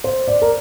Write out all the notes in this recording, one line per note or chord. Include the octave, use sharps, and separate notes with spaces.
C5
D5
A#4